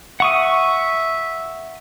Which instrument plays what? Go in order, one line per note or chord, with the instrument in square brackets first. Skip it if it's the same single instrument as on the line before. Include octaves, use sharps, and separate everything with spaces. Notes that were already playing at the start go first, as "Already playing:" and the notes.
[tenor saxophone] E5 [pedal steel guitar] F#5 C#6 D#6